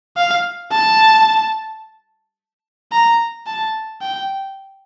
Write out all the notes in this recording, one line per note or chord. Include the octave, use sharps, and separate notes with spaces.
F5
A5
A#5
A5
G5